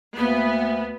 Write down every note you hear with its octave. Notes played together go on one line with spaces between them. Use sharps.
D2 A#3 B3